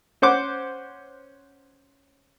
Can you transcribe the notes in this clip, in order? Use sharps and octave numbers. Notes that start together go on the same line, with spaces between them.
C#4 C5 F#5 D6